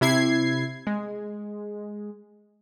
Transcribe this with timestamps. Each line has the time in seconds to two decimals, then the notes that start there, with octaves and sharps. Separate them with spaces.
0.01 C3 E4 G#6 C7
0.87 G#3